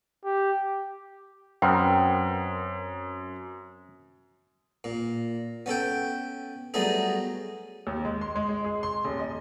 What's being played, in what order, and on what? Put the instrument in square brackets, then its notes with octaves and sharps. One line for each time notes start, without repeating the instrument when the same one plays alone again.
[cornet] G4
[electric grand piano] F#2 [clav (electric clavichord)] B3 C4 A#4 [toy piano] G5
[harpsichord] A#2
B3 C#4 A4 G5
F#3 G3 A3 B3 D#4 G#4
[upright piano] D#2
G#3
C6
G#3
G#3
G#4
C6
D#1
D#5